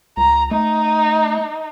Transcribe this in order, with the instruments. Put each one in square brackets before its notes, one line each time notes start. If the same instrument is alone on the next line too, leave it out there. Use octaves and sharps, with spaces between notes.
[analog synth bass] C#2 [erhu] A#5
[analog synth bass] A3 [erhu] D#4